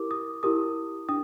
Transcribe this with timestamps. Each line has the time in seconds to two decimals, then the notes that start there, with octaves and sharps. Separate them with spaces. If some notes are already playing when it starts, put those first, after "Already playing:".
Already playing: E4 G4 A#4 D6
0.11 D#6
0.43 E4 G4 A#4 D#6
1.09 D4 D#6